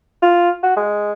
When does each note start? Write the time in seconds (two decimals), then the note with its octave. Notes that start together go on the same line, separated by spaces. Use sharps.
0.22 F4
0.63 F#4
0.77 G#3